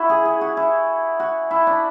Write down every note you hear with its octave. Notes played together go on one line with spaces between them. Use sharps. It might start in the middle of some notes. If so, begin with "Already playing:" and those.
Already playing: E4 F#4
G#4
G#4
F#4
E4
F#4
E4
D4